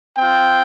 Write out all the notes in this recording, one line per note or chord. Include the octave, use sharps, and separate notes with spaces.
C4 F4 G5